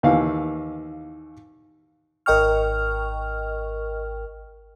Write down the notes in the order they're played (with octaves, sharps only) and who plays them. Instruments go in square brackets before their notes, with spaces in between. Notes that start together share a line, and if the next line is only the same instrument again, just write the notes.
[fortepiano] D#2 E3 F5
[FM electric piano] G#1 A#4 D#5 G5 C#6 F6